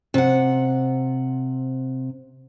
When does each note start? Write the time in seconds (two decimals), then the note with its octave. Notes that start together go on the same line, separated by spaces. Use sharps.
0.14 C3 F#5